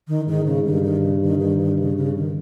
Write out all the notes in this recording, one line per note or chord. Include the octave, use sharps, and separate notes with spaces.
D#3
G#2 D#3
C#3
G2 D#3
D#3
C#3
D#3
D#3
D#3
C#3
C#3
D#3